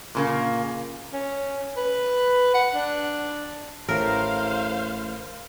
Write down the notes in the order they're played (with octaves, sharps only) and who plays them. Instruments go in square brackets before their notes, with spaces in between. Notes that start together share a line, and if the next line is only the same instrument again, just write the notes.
[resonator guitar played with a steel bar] A#2 C#3 A#3
[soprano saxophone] C#4
B4
F#5
D4
[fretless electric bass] A1 A2 [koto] A#4 [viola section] C5 F5